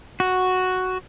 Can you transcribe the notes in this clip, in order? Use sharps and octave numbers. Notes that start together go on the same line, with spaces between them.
F#4